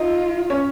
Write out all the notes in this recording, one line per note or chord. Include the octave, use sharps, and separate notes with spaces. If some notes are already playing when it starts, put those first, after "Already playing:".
Already playing: D#4 F4 D#5
C#4 C#5